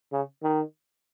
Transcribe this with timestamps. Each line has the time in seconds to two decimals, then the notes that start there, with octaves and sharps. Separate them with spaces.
0.12 C#3
0.43 D#3